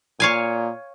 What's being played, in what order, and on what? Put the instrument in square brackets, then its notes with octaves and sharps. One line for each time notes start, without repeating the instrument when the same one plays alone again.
[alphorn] A#2 [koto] C#5 F5 G#5